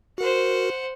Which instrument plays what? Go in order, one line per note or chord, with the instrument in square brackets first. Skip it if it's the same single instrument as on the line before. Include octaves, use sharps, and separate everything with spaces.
[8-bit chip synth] F#4 A#4 [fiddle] C5 F#5